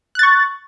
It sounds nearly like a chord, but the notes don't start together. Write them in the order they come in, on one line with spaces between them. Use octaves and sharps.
F#6 A6 C#6